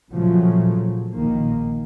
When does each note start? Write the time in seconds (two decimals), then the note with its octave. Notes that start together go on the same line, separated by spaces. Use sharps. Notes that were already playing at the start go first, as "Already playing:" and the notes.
0.13 A#2 C#3 F3 F#3 A3
1.13 A#1 D#3 A#3